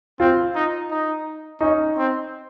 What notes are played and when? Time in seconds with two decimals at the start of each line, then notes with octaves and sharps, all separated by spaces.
0.20 C4 F4
0.55 D#4
0.91 D#4
1.61 C#4 D#4
1.97 C4